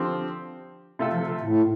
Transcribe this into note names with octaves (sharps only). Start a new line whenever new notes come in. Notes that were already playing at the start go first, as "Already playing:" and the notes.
Already playing: D3 F3 C4 G4
C3 A3 F4 A4
F3
D3
A2